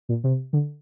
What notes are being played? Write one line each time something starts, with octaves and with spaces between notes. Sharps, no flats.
A#2
C3
D3